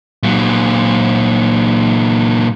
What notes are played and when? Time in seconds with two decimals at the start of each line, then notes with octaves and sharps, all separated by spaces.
0.23 A#2 F#3